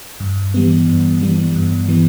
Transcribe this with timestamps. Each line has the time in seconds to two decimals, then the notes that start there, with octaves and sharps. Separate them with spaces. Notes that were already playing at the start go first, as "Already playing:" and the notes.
0.20 G2
0.54 E3 G3 B3
0.88 G2
1.21 E3 G3 B3
1.55 G2
1.88 E3 G3 B3